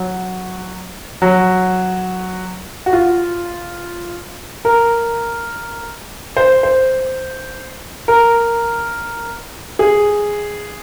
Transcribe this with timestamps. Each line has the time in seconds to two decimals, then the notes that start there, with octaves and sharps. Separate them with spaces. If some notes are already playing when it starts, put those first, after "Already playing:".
Already playing: F#3
1.22 F#3
2.86 F#4
2.93 F4
4.65 A#4
6.37 C5
6.63 C5
8.08 A#4
9.79 G#4